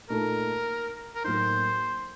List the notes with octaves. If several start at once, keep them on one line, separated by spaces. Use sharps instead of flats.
A#2 A3 D#4 A#4
A#4
A2 F#3 A#3 D#4 C5